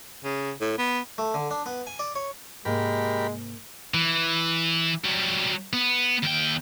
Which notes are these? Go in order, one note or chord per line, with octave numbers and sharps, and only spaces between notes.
C#3
A2
B3
A3
D3
D4
B3
G#5
D5
C#5
G#2 C3 G#3 A#3 G4 A#4 B5
E3
F#3 G3
B3
D#2 G5